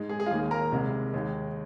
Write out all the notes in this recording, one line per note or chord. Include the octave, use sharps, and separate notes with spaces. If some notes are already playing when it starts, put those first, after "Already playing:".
Already playing: G#2 G#3
G#4
G#4
F4
D#2 D#3 A#3 G#4
A#4 A#5
C2 C3 G#3
D#2 D#3 G#3